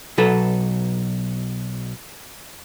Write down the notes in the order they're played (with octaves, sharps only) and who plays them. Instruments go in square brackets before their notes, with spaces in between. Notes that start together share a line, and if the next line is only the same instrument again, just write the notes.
[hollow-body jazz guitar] B1 F#3 A4 B4